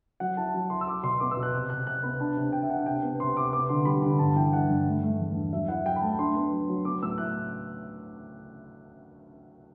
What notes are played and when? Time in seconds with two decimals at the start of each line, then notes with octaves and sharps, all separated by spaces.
0.20 F#3 F#5
0.37 E4 A5
0.54 F#3
0.70 E4 C6
0.81 E6
0.87 E4 D6
1.03 B2 C6
1.20 B3 D6
1.31 E6
1.37 B2
1.43 F#6
1.54 C3
1.70 C3 F#6
1.87 C3 F#6
2.03 B3 B5
2.20 D4 A5
2.36 C3
2.53 C3 G5
2.63 E5
2.69 D4 F#5
2.86 C3 G5
3.03 B3
3.20 C3 C6
3.36 C3 D6
3.53 B3 D6
3.69 D3 C6
3.85 G3 B5
4.02 D3 B5
4.19 G2 A5
4.36 E3 G5
4.53 E4 F#5
4.69 G2
4.86 A3
5.03 A3
5.19 E2
5.35 D4
5.53 F#3 E5
5.68 E4 F#5
5.85 F#3 G5
5.96 B5
6.02 A3 A5
6.18 D4 C6
6.36 B3
6.52 F#3
6.69 F#3
6.85 B3 D6
7.02 A2 E6
7.18 E4 F#6